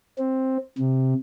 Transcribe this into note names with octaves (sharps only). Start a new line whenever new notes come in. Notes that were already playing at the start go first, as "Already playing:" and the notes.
C4
C3